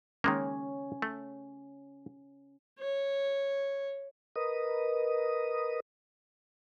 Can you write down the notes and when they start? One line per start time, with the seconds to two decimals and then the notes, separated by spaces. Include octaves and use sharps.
0.24 D#3 G#3 A#3 C#4
1.02 A3
2.79 C#5
4.36 A#4 B4 D#5 D#6